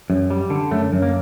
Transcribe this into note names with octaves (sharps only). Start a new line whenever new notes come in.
F#2
G3
D3
F#2 A3
F#2
A#3